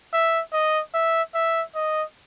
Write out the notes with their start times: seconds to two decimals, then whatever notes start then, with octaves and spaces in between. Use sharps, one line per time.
0.13 E5
0.53 D#5
0.94 E5
1.34 E5
1.75 D#5